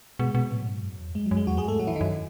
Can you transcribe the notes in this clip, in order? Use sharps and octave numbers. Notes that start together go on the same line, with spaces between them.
B2 G#3
B2
A2 F#3
G#2
F#2
E2
F#2 G#3
F#3
F#2
G#3
E2 F#3 F#4
F#2 G#3 G#4
G#2 A3 A4
A2 F#3 F#4
E3 E4
D#3 D#4
F#2